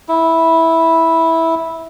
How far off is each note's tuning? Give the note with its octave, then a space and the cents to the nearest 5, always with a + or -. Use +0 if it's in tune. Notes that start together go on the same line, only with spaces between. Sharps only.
E4 -10